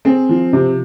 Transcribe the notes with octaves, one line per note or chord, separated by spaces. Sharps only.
C4 G#4
F3
C3